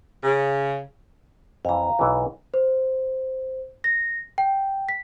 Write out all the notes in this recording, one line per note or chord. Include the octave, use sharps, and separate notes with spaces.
C#3
F2 E3 F5 A#5
B1 E3
C5
A#6
G5
B6